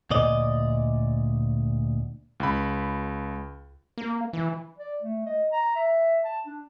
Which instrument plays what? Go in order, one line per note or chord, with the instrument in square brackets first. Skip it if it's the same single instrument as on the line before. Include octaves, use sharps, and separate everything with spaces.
[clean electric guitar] D2 A#2 D5 D#5
[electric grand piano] C#2 B5
[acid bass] A#3
E3
[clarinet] D5
A3
D#5
A#5
E5
A5
D4